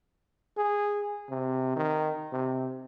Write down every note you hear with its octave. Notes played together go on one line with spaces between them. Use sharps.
G#4
C3
D#3
C3